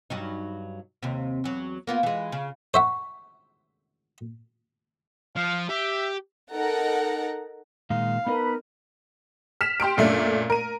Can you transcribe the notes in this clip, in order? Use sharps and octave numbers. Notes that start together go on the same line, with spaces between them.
G2 F#3 D#4
D#2 C3
E2 F#3
A#3 B3 F4
E3 G#3
C#3
C5 E5 F#5 C#6
F3 F5
G4 E5
D#4 A4 A#4 F#5 A#5
A#2 D#3 G#3 F5
B3 D#4 A#4 B4 D#5 B5
F6 B6 E7
G4 C6 F6 D7
F#2 A#2 A3 D4
A#4 D#7